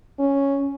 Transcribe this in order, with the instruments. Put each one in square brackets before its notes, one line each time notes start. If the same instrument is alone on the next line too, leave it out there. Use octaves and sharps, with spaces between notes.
[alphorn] C#4